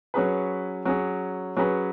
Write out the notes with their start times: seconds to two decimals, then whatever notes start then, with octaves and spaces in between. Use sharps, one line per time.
0.14 F#3 C#4 G#4 B4
0.85 F#3 C#4 G#4
1.57 F#3 C#4 G#4 B4